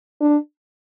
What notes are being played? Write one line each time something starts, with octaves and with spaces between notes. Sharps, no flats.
D4